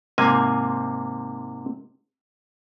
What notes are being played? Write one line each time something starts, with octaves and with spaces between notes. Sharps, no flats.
G#2 C3 A#3 G#5